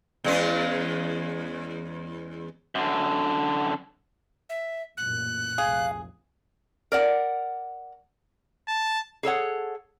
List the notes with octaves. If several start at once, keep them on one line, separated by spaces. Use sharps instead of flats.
E2 G#3 C#4
F#2 D3
E5
A1 F#2 A#2 F#6
F1 C2 G#4 F5
A#4 D5 F#5
A5
G#4 A4 C#5 F#5